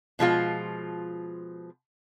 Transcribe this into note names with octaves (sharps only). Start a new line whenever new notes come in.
B2 F3 G#3 F4